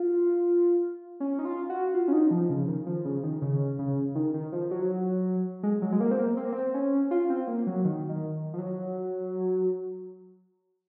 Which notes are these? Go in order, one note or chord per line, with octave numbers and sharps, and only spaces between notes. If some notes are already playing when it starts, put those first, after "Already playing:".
Already playing: F4
C#4
D#4
F4
F#4
F4
C#4
D#4
F3
C#3
D#3
F3
C#3
D#3
C#3
C#3
D#3
D#3
F3
F#3
G#3
F#3
G#3
A#3
C4
A#3
C4
A#3
C4
C#4
F4
C4
A#3
F#3
D#3
D#3
F3
F#3